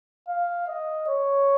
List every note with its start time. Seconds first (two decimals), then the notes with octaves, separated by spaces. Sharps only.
0.28 F5
0.68 D#5
1.08 C#5